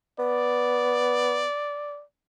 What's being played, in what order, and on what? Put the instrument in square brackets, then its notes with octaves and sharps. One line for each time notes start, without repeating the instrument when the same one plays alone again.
[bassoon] B3 [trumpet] D5